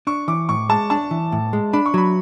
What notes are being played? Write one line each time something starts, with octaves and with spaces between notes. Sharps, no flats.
D4 C#6
E3 D6
A2 C#6
G#3 A5
D4 A5
E3
A2
G#3
D4 B5
C#6
F#3 B5